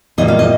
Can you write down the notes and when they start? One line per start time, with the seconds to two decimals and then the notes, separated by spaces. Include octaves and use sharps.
0.18 A#2 G3 A#3 D#5
0.28 F5
0.39 D#5